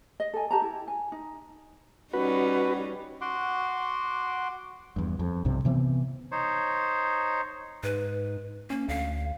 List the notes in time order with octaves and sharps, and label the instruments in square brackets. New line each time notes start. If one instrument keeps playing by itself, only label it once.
[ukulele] D#5
A4 G#5
G4 A5 A#5
E4
G#5
D#4
[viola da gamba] G3 C#4 D#4 [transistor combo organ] F#4 B4
[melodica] F#4 F#5 C6 D6
[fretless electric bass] E2 G2
F2
B1 G2 C3
C3 E3 B3 C4
[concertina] D#4 C5 C#5
[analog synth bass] G#2 [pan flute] B4
[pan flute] A#3 [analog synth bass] C#4
[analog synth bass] D2 [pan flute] F5